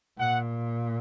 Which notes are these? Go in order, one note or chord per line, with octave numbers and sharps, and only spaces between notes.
A#2 F#5